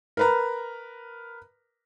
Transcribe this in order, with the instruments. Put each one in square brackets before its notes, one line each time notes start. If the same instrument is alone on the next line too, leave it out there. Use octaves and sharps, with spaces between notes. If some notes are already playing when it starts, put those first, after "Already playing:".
[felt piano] A#4 B4 A#5